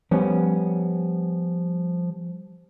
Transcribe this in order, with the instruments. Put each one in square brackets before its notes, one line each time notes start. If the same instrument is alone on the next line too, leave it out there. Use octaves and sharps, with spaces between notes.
[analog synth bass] F3 [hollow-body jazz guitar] G3 B3 C#4